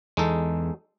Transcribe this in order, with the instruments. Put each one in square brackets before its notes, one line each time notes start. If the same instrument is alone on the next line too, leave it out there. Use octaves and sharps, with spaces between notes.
[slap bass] E2 E3 [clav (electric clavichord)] G#3 D#4 A4